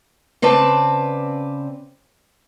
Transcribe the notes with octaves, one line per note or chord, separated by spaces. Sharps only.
C#3 C4 B4 D5 A5